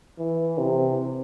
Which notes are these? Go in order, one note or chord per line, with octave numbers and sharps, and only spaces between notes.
E3
C3